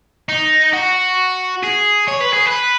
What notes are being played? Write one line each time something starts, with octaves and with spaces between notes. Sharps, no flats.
D#4
F#4
G#4
C#5
B4
G#4
B4